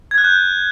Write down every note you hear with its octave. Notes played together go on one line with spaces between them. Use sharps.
G#6
F#6
G6